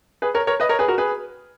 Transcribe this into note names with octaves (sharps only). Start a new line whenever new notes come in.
G#4 B4
A#4 C#5
A#4 C#5
B4 D#5
A#4 C#5
G#4 B4
F#4 A#4
G#4 B4